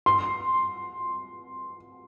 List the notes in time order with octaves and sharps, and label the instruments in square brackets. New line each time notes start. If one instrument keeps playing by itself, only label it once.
[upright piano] C6